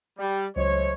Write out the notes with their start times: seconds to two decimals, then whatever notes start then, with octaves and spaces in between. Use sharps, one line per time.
0.19 G3
0.56 C#2 F#3 A3 C5 C#5 D#5